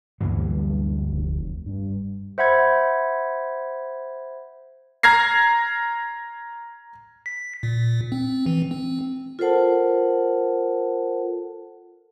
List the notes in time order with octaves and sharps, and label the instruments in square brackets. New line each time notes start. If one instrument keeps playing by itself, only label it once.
[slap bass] D2 E3 F#3 [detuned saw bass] G2
[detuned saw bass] F1
G2
[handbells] C5 E5 F#5 B5 G#6
[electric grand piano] A#5 F6 G#6 A#6 C7
[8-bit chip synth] B6
A#2
C4
E3
C4
[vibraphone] F4 A4 A#4 C5 F#5 A5